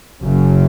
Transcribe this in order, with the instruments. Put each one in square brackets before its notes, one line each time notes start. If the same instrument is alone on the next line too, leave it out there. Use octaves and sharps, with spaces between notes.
[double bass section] F#1 F#2 C#3